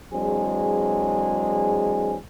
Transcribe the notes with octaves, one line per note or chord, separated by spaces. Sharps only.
E3 F#3 G#3 C4 D4 G#4